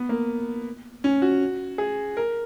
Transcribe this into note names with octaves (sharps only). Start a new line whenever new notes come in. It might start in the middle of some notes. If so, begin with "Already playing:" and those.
Already playing: B3
A#3
C#4
F#4
G#4
A#4